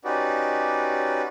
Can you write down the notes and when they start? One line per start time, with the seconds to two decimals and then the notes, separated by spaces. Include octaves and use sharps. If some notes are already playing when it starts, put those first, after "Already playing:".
0.04 C#4 D#4 F#4 G4 B4 D5